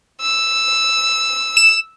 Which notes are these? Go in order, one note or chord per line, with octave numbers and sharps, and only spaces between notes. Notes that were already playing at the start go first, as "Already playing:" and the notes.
E6
E7